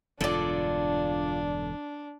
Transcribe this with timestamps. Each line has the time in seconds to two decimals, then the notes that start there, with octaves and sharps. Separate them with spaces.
0.21 E1 G2 D3 D4 F4 A4 D5